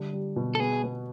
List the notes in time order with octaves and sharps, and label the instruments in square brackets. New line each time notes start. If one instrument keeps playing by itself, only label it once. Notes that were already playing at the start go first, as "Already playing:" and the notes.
Already playing: [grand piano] D3 G3
G3
B2
[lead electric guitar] A4
[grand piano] B3 [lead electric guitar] G#4
[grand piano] B3